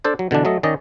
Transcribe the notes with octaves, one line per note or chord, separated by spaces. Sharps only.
D4 A4 C5 D5
F#3
B2 D3 E3 D4
F#3 A3 A4 D#5
D#3 C#4 D5 D#5